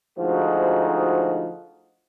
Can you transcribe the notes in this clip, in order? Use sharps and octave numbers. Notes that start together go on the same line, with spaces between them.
D2 G#2 F3 D#4 F#4 G#4